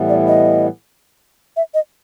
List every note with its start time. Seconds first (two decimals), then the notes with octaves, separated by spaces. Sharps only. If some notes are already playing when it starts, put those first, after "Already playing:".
Already playing: A2 E3 G3 B3
0.09 D5
0.28 D#5
1.57 E5
1.74 D#5